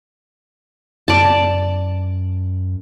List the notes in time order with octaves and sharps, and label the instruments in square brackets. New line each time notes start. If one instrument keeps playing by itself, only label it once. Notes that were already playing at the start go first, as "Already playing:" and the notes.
[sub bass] F#2 [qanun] D5 A5